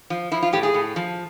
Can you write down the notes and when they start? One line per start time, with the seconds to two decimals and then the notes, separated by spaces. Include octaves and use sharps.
0.10 F3
0.32 F3 E4
0.43 F4
0.53 A2 G4
0.63 G#4
0.74 A2
0.96 F3